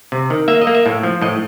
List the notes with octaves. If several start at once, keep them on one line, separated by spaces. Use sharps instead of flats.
C3
D#3
A#3 E5
D#5
A#3
E5
A2
F3
A2 D#5